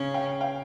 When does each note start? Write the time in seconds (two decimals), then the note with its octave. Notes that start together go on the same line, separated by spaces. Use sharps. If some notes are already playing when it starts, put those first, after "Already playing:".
Already playing: C#3 C#4
0.14 F5 G5
0.41 F5 G5